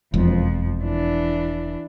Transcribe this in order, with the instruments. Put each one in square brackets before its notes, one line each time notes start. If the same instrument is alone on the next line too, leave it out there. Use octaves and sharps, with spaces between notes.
[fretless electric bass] E1 [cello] F2 F3
[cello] E3 D4